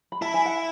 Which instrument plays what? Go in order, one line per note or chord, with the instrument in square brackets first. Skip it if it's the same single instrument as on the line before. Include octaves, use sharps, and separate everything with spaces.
[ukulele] B5
[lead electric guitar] E4 [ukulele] A5
[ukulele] G#5
F#5